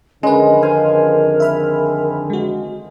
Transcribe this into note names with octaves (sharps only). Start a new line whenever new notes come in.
F2 D3 D#3 G#3 C#4 A#4 B4
C5 F5 G#5
E5 B5 F6
G#3 F#4